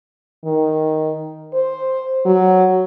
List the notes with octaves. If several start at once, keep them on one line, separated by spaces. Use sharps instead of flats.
D#3
C5
F#3